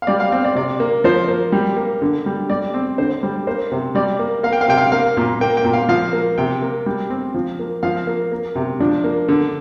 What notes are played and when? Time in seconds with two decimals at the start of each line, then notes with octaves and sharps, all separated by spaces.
0.02 F5
0.07 G3 D5
0.20 F5
0.32 C4 F5
0.44 D5
0.55 C3 D5
0.80 A#3
1.04 F3 C5
1.28 A#3
1.52 G3
1.77 A#3
2.02 D3
2.26 G3
2.50 G3 D5
2.74 C4
2.98 D3 C5
3.23 G3
3.47 A#3 C5
3.72 C3
3.95 G3 D5
4.19 A#3
4.43 A#3 F5
4.53 G5
4.61 F5
4.68 C3 G5
4.78 F5
4.92 A#3 F5
5.17 A#2
5.41 A#3 G5
5.57 G5
5.64 A#2
5.73 F5
5.89 F3 F5
6.13 A#3
6.38 C3 G5
6.62 A#3
6.86 G3
7.10 C4
7.34 F3
7.59 A#3
7.83 F3 F5
8.07 A#3
8.32 A#3
8.56 C3
8.80 F3 D4
9.04 A#3
9.28 D3